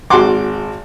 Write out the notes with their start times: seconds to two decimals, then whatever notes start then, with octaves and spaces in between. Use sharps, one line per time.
0.10 G#1 F#4 F#5 C6 D6